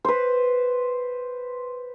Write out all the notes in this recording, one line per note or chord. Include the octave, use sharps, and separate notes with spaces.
B4 C5